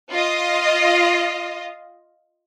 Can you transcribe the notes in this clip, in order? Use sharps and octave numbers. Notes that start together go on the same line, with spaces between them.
F4 D#5